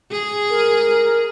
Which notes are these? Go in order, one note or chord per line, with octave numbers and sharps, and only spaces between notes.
G#4
A#4